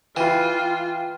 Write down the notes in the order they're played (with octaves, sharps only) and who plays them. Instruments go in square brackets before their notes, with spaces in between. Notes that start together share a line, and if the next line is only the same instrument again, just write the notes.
[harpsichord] E3 [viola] F4 [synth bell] G5